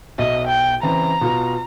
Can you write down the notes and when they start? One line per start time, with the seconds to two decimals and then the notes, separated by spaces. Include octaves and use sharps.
0.18 B1 B2 D#5 E5
0.47 G5
0.83 C#3 E3 C4 A#5
1.21 B2 F4